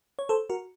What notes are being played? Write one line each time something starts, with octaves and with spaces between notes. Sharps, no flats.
C#5
A4 C5
F#4 A#4